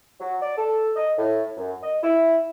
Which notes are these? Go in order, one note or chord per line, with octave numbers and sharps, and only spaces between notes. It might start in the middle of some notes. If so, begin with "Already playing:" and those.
F#3
D5
A4
D#5
A2
F#2
D#5
E4